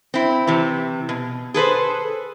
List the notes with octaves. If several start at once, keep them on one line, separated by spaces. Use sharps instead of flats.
C4 E4
C3 E3
B2
G#4 A4 B4 C5